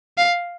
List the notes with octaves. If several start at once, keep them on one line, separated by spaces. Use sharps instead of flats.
F5